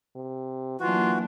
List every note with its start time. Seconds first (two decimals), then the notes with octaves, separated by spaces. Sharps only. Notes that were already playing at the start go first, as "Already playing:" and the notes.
0.15 C3
0.80 E3 F#3 A#3 D4 F4 F#4